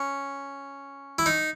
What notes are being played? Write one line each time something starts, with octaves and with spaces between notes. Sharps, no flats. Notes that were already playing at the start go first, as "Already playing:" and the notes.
Already playing: C#4
E4
D#4